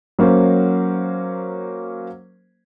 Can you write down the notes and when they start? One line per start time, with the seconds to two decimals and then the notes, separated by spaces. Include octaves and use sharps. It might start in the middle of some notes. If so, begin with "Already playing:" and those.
0.19 F#3 A#3 C#4 C5